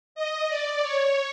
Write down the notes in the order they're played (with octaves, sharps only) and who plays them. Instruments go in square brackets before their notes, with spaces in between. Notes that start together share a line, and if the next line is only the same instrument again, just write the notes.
[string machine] D#5
D5
C#5